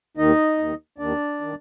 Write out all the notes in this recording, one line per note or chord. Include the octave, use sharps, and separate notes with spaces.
D#2 D#3 D#4 D#5
D#2 D#3
D#2 D#3 D4 D5
D#3